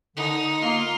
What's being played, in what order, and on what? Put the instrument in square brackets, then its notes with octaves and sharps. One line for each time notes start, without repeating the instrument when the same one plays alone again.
[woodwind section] D3 [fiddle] D#4
[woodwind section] A#3 [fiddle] F4